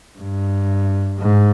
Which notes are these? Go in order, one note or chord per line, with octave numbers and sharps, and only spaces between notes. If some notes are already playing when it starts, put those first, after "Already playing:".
G2
G#2